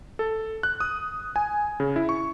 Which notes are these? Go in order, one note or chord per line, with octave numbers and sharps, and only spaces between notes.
A4
F#6
D#6
G#5
C#3
E4
C#6